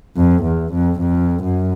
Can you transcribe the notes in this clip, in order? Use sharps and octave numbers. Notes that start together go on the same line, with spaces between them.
F2
E2
F2
F2
F#2